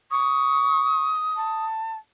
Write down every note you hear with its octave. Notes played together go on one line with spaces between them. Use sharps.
C#6 D#6
A5